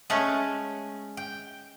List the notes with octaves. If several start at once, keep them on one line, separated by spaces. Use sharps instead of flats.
G#3 A3 C#4
G5